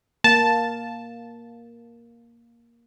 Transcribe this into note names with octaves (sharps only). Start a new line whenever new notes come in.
A#3 A5